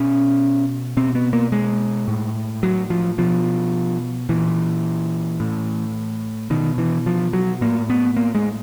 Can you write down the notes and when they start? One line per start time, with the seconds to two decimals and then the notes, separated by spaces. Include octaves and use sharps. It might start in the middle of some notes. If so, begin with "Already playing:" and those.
Already playing: B2 C#4
0.97 B2 C4
1.15 B3
1.33 A#3
1.52 G#3
2.08 A2
2.63 F#3
2.90 F3
3.18 B2 F3
4.29 A#2 E3
5.40 A2
6.50 B2 D#3
6.78 E3
7.06 F3
7.33 F#3
7.61 A2 A#3
7.90 B3
8.17 A#3
8.35 G#3